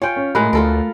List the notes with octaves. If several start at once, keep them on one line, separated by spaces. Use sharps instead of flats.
F4 C#5 G5 G#5
C#4
A2 G#3 A3 A#4 B5 F#6
D2 F4 A4 A#4